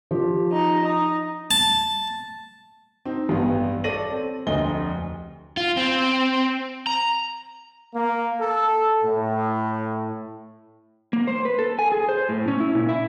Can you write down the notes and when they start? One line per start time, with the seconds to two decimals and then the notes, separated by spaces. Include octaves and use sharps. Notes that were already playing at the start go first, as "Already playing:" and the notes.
0.11 F3 G4
0.52 D#4 D#5
0.85 D#4 D#6
1.51 A5
3.05 C4 D#4
3.29 A1 G2 B3
3.84 A4 C#5 D5 A#6 D#7 F#7
4.12 C4
4.47 F1 D2 D#5 G7
5.57 F4
5.77 C4
6.87 A#5
7.95 A#3
8.41 A4
9.04 A2
11.13 A#3
11.27 C5
11.45 B4
11.59 A4
11.79 G#5
11.92 G#4
12.09 C5
12.29 A2
12.48 C#4
12.60 E4
12.75 A#2
12.89 E4